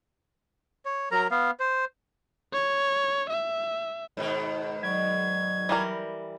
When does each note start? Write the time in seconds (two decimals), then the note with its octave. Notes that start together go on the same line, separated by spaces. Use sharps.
0.85 C#5
1.11 F#3 A#4 A#5
1.31 B3 F5
1.60 C5
2.53 C#5
3.30 E5
4.17 G#2 B2 D#3
4.83 F#3 D5 C#6 G#6
5.69 E3 G3 A#4